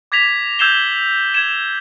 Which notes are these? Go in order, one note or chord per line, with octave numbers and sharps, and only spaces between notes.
D6 G#6 A#6 B6 F7
E6 G6 G#6 C7 E7 G7
G#6 E7